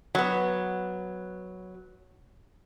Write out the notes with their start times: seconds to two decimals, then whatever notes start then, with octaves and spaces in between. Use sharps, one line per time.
0.15 F#3 B3